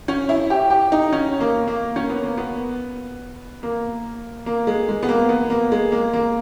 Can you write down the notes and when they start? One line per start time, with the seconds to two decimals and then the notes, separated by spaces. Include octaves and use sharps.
0.08 C#4
0.29 E4
0.50 G4
0.70 G4
0.92 D#4
1.13 C#4
1.40 A#3
1.68 A#3
1.96 C#4
2.10 B3
2.24 A#3
2.38 B3
3.63 A#3
4.46 A#3
4.67 G#3
4.89 G#3
5.03 B3
5.09 A#3
5.29 B3
5.50 A#3
5.72 G#3
5.92 A#3
6.13 A#3